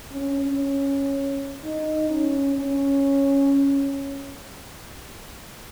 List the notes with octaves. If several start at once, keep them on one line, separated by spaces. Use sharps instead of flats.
C#4
C#4
D#4
C#4
C#4